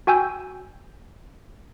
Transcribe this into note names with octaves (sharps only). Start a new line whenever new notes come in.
F#4 G5 G#5 E6 G6